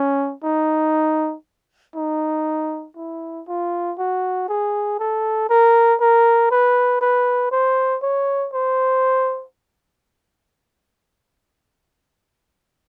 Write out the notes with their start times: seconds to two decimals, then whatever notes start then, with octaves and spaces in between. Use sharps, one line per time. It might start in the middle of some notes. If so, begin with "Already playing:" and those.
Already playing: C#4
0.44 D#4
1.96 D#4
2.97 E4
3.48 F4
3.99 F#4
4.49 G#4
4.99 A4
5.50 A#4
6.00 A#4
6.51 B4
7.01 B4
7.52 C5
8.03 C#5
8.54 C5